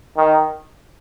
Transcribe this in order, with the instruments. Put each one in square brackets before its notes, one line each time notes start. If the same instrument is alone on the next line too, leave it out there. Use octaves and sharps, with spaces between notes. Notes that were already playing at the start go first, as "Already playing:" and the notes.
[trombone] D#3